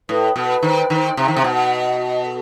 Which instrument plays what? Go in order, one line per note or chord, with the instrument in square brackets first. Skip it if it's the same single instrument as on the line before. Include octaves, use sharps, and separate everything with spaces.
[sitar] A2 [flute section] B4
[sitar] B2 [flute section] B4
[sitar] D#3 [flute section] C5
[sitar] D#3 [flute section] C5
[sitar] C3 [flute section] C5
[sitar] D#3
C3
[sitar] B2 [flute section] F#5
[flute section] D#5
F#4
A4